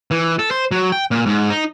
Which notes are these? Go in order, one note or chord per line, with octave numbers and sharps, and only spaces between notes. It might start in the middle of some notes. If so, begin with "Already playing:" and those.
E3
A4
C5
F#3
G5
A#2
G#2
D#4